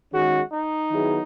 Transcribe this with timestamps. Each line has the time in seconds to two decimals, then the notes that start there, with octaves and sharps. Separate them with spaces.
0.13 D#3 G#3 C#4 F#4 G#4
0.52 D#4
0.91 D#3 F#3 B3 E4 G#4